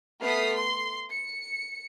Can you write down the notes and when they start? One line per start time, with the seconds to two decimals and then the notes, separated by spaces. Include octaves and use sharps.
0.21 A3 B3 D#6 F6 B6 C7
0.55 C6
1.12 C#7